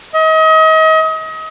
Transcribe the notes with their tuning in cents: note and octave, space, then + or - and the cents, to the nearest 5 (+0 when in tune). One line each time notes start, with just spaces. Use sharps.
D#5 +35